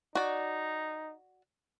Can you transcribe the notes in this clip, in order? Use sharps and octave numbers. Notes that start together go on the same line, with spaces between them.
D#4 F#4 D5